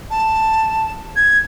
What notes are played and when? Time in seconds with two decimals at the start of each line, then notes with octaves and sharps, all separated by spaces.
0.11 A5
1.16 G#6